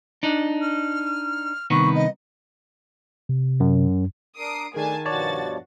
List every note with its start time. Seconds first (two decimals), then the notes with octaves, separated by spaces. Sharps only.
0.23 D4 D#4
0.61 F6
1.70 C2 D#3 B3 C#6
1.95 D#5
3.29 C3
3.60 F#2
4.38 D4 A#4 D#6 C7 D7
4.74 D#3 A3 D4 G#4 A#4 G#5 A5
5.06 G2 B2 F3 F#4 C#5 D5 A5 A6